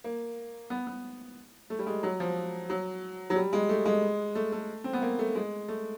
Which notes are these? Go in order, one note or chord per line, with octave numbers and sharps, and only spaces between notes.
A#3
B3
B3
A3
G3
G#3
F#3
F3
F#3
F#3
G3
G#3
A3
G#3
A3
A3
C4
B3
A#3
A3
G#3
A3